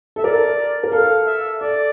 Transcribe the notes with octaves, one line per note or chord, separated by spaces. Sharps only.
A4 E5
A#4 D5
A#4
A4 F5
E5
A4 D5